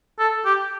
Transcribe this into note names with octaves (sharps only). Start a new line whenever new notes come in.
A4
G4